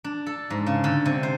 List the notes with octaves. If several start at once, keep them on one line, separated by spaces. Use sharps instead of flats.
D4
A4
G#2
C#3
D3
C3
C5